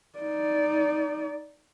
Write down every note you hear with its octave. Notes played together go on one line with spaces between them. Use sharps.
D#4 D5